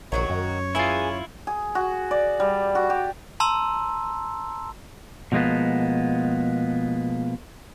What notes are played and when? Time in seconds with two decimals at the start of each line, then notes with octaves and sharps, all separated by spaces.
0.12 A#1 D#3 F#3 F#4 C#5
0.30 F#2
0.75 E3 E4 F4 G#4 G#5
1.47 G#4
1.75 F#4
2.11 D5
2.40 G3
2.75 F#4
2.90 G4
3.40 A5 A#5 C6 E6
5.32 B2 F3 G#3 A#3 B3